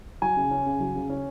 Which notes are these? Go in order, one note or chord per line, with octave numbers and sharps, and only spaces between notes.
F#3 G#5
C#3
C#4
C#3
F#3
C#3
C#4